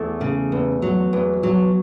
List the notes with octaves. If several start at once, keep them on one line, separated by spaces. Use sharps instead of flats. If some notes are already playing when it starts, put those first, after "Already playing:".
Already playing: E2 A3
C#3
E2
F#3
E2
F#3